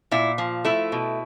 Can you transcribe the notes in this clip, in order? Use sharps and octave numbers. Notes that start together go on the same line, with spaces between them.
A#2 E4
F3
A3 E4
B2